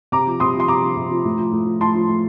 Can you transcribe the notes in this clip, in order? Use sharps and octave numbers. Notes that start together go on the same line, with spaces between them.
C3 A#5 D6
F3
C3 C6 D#6
F3
C6
C3 A#5 D6
F3
C3
F3
A2
F3
A2
F3
A2 A5 C6
F3
A2